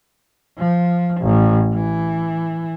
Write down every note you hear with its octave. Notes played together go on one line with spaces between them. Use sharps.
F3
A1
E3